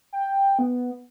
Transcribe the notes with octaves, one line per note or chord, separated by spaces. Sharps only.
G5
B3